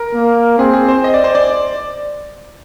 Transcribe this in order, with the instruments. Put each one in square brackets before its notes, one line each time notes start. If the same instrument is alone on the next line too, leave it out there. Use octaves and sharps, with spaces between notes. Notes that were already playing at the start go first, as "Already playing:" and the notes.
Already playing: [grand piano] A#4
[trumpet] A#3
[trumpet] C4 [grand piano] G#4
[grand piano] G#4
C5
D#5
D5
C5
D5